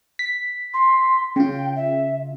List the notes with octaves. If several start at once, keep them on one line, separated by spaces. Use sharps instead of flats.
B6
C6
C#3 F4 G5
E5